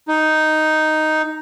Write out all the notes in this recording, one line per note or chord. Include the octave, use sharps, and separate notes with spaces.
D#4